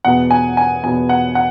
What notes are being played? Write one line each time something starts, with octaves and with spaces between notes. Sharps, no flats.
E2 B2 B3 F#5
G#5
G#5
E2 B2 B3 G#5
F#5
F#5